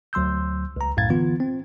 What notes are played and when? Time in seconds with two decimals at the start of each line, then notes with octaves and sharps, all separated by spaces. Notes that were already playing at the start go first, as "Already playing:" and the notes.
0.13 D2 F#3 C6 E6 G6
0.76 C#2 A#5
0.97 C2 F#2 A2 F5 G#6 A6
1.10 D3 E3 B3 F4
1.40 C4